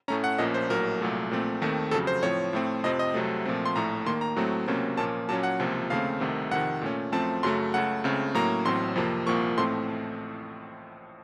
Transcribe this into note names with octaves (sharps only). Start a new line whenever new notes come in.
A2 A3 C#4 A#5
F#5
A#1 A#2 F3 A#3 C#4 D#5
C5
A#1 A2 F#3 A#3 A#4
C2 A#2 F#3 A3
A#1 A#2 A3 C4
D#2 D#3 A3 C4
F2 C#3 F#3 A4
C5
A2 F3 C4 C#5
A2 A3 C4
F2 C3 F3 C4 D#5
D#5
C2 C3 F#3 A3
A#2 F3 A3 C4
C6
A#1 A2 A3 A#5
D#2 D#3 A#3 C6
A#5
A2 F#3 A3 C4
C#2 C3 F#3 A#3 C#4
A#2 F3 A#3 C#4 A5
A#2 F#3 A#3 C#4 A5
F#5
C#2 C3 F3 A#3
D#2 C#3 A3 C4 F5
C2 C3 D#3 A3
F2 C3 D#3 F#5
A#2 A3 C#4
F#2 F3 A3 C4 A5
F#2 C#3 F#3 A3 C6
C#2 C#3 A3 F#5
C#2 C#3 A3 C4
A2 F#3 A#3 C#4 A#5
A1 A2 F#3 C4 C6
F2 C3 F3 A#3
C2 A#2 F3 A#3 C#6
A1 A2 A3 C4 C6